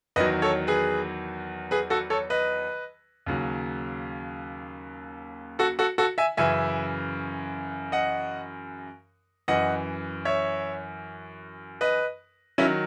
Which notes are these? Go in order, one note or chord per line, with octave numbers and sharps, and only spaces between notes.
E2 D#3 F#3 B4 D#5
A4 C#5
G#4 B4
G#4 B4
F#4 A4
A4 C#5
B4 D#5
D#2 C#3 F#3
F#4 A4
F#4 A4
F#4 A4
E5 G#5
F#2 C#3 E3 E5 G#5
D#5 F#5
F#2 E3 D#5 F#5
C#5 E5
B4 D#5
D#3 F#3 C#4 E4